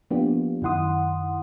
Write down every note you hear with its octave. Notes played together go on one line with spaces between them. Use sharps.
F3 A#3 B3 D4 F4 G4
F#2 D#3 E4 F#5 C6 D#6